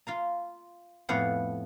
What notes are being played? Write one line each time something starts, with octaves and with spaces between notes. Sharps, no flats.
F4 F5 A#5
F2 A2 A3 B3 F5 F#5